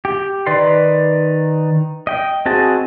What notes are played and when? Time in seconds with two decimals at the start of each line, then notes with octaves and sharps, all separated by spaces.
0.05 G4
0.46 D#3 D#4 B4 D5 C6
2.07 D#5 G5
2.46 C4 F#4 G#4 D#5 A5